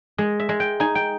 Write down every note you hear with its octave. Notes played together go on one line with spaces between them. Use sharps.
G#3 D#5
E5
G#3
G5
D#4 G#5
G5